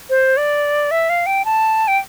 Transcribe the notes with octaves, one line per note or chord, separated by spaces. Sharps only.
C5
D5
E5
F5
G5
A5
G5